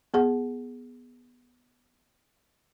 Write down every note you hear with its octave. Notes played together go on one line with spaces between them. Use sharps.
B3 G#4 F#5